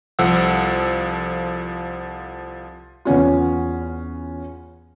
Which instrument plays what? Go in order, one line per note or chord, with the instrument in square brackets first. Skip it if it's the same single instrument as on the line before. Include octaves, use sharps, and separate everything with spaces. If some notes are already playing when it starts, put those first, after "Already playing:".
[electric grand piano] C2 F3 A4 F#5 E6
[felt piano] E2 B3 C#4 F4